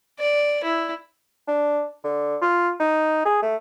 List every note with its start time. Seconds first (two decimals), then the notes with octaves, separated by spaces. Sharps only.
0.19 D5
0.63 E4
1.48 D4
2.04 D3
2.42 F4
2.80 D#4
3.25 G#4
3.42 A3